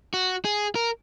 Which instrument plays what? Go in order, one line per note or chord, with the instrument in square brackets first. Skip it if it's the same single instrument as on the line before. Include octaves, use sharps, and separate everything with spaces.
[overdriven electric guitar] F#4
G#4
A#4